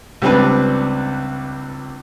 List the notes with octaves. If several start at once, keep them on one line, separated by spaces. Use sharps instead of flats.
C#2 G3 C4 D4 B4